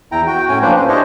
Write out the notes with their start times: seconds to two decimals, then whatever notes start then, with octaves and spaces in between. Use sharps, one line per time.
0.12 E2 E4 G5 A#5
0.27 F#4 G5
0.49 A2 C#4 G5 G#5
0.62 F3 A#3 D4 B4 C5
0.76 C#4
0.89 D4 E4 G4 C5 C#5 D#5